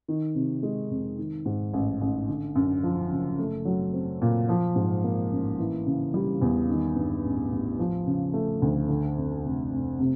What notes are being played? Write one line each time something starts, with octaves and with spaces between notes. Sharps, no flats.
D#3
C3
G#3
F2
D#3
G#2
A1
A1
D3
F#2
F3
F#1
A3
F#3
C4
A#2
F3
G#2
A#3
A1
E3
C#3
G3
E2
D#3
G2
A1
A1
F3
C#3
A3
D2
D3
F2
F1
F1
C3